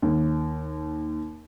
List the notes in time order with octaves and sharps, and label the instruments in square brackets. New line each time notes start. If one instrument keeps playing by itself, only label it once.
[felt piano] D#2